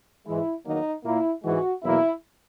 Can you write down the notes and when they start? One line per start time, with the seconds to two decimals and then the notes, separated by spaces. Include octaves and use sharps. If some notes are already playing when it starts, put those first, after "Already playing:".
0.26 G#2 E3 G#3 E4
0.65 E2 D#3 F#3 A#3 D#4
1.04 A#2 A#3 E4
1.44 G#2 E3 G#3 F#4
1.83 E2 B2 F#3 A#3 E4